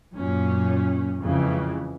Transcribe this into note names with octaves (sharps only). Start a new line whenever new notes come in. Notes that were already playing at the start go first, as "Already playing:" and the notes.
F#2 A#2 C#4
F2 C#3 E3 G#3